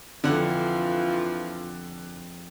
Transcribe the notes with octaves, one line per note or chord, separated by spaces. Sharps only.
F2 D3 E3 F3 F4 F#5